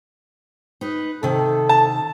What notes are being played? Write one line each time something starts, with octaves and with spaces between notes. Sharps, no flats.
D#4 B4
C3 D#3 A4
A5